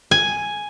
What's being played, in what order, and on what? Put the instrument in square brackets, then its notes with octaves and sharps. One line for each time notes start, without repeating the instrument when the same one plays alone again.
[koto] G#5